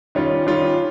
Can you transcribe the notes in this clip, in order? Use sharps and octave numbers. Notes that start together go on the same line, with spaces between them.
D#3 G3 C#4 F4
D#3 G3 C#4 F4